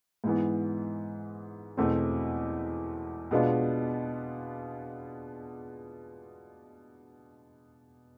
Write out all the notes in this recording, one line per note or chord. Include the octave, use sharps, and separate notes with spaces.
G#2 E3 B3
E2 B2 A3 C4
B2 G#3 B3 D4 F4